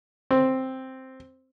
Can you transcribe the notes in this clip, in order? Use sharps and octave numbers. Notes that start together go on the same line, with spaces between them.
C4